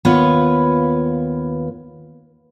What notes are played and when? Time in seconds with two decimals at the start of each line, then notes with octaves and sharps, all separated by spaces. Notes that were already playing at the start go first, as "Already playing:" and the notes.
0.05 D#2 B3 F4 B4 C#5